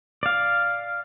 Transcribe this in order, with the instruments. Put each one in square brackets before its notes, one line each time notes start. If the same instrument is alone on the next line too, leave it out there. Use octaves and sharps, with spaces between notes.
[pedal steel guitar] D5 F5